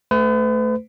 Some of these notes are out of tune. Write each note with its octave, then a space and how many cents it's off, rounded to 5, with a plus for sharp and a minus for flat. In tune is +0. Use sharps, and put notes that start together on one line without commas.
A3 +0 B4 +40